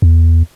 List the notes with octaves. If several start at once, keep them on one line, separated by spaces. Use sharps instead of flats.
E2